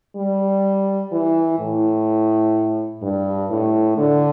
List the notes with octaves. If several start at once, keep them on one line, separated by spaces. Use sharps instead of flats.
G3
E3
A2
G2
A2
D3